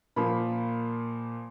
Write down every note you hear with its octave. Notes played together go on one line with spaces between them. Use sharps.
A#2 F3 A#3 B5